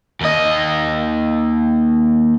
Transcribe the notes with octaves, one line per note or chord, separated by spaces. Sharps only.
D#2 D#5